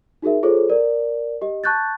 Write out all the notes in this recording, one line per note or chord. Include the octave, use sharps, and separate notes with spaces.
D#4 F#4 G#4 A#4 E5
F4 G#4 A4 C5 C#5
A#4 D5
G4 D#5
A5 C#6 F#6 G6 A6